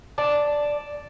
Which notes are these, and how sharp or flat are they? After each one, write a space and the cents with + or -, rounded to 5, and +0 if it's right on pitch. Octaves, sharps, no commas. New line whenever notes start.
D5 +0 A5 +0